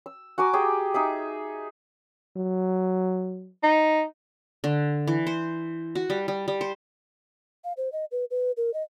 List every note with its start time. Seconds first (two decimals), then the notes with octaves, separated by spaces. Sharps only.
0.06 E6
0.38 F#4 G#5 A#5 D6
0.53 G4 G#4 G5
0.94 D#4 G#4 E5
2.37 F#3
3.63 D#4
4.64 D3
5.08 E3
5.27 C5
5.95 F#4
6.10 G3
6.28 G3
6.48 G3
6.61 C5
7.64 F5
7.77 C5
7.92 D#5
8.12 B4
8.31 B4
8.57 A#4
8.74 D#5